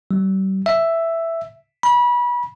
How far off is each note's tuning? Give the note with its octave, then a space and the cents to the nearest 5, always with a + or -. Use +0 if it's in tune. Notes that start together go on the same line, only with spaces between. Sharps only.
G3 -40
E5 +5
B5 -30